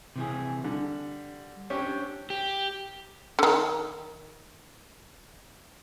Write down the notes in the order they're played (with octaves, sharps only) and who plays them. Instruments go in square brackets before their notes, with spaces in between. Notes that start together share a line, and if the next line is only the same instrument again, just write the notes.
[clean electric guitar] C3 E3 G#4
[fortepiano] D3 [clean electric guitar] G3
[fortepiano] C#4 G4 [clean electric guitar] D4 C5 C#5
[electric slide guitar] G4
[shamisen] D3 D#3